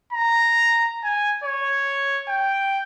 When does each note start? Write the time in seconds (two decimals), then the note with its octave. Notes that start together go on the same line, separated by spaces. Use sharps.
0.13 A#5
1.04 G#5
1.44 C#5
2.28 G5